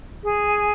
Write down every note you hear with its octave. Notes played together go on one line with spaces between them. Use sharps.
G#4
G#5